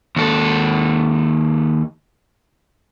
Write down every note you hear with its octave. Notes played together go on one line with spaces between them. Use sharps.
D#2 A4